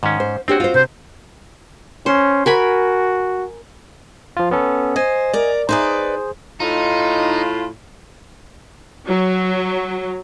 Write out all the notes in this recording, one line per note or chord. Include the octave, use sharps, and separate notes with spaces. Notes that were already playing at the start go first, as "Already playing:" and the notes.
G#2 D#3 C#4
C5
C4 D4 F#4 G4 C#5
F4 C5
C3 C5
C#4 C5
F#4 A#4 G#5 B5
F3 F4
B3 C#4 A4
C5 D#5 G#5
A#4 D5
D#4 G#4 B4 C5 D5
A2 D#4 F4
F#3